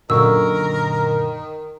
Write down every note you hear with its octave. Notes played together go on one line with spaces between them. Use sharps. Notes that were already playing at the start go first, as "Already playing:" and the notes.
F#2 A#2 D3 D#3 A#4 C#6 E6